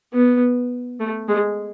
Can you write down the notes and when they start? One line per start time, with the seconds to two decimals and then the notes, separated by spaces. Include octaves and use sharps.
0.14 B3
1.00 A3
1.28 G#3